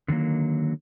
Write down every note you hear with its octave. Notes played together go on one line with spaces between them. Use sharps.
D3 D#3 F#3 A#3